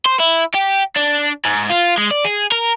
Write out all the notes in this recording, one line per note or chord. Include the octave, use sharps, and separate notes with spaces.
C5
E4
G4
D4
G#2
F4
G#3
D5
G#4
A#4